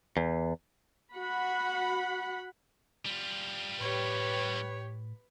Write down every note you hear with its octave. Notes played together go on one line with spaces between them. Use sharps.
E2
F#4 F#5 B5
G3 F4
A2 G4 B4 C#5